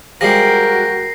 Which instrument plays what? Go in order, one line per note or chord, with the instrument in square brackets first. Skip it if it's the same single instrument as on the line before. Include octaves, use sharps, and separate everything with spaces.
[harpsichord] F3 G3 G#3 [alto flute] F#4 [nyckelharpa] A#4 G5 [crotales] A#6 C7